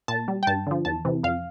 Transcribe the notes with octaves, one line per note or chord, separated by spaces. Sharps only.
A#2 A5
G3
G5
G2 A5
D3 F3
E2 A5
C3 E3
F2 F5